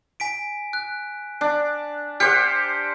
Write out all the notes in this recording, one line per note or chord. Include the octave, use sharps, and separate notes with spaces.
G#5 B6 D7
F#6
D4
G4 C5 F#5 F6 G6 C#7